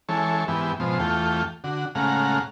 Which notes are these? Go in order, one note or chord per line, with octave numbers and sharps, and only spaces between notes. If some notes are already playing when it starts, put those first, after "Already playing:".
E3 G#3 A4 C#5
G#2 E3 B3 G4
G#2 B2 F3 C5
E2 A3 F4 G5
D3 F#4
A2 C#3 G#3 F5 F#5 A#5